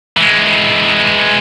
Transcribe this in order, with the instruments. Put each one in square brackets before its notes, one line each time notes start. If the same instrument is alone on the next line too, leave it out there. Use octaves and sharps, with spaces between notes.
[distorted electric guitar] E3 G#3